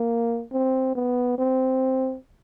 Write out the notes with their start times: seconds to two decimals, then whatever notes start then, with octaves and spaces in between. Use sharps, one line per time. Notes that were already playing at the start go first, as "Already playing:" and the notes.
Already playing: A#3
0.53 C4
0.95 B3
1.39 C4